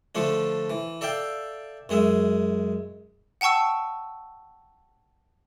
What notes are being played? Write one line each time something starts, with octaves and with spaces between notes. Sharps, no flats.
D3 F3 A3 D4
E3
A4 D5 E5 F5 G5
F#2 G#3 G#4 E5
F#5 G5 A5 C#6 E6